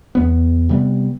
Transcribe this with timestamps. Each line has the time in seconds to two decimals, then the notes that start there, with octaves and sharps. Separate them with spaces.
0.15 E2 B3
0.69 C3 G3 B3